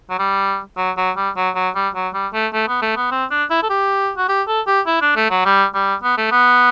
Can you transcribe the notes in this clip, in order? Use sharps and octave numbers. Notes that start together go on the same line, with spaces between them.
F#3
G3
F#3
F#3
G3
F#3
F#3
G3
F#3
G3
A3
A3
B3
A3
B3
C4
D4
E4
A4
G4
F#4
G4
A4
G4
E4
D4
A3
F#3
G3
G3
B3
A3
B3